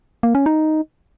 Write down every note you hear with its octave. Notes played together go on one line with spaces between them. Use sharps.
A#3
C#4
D#4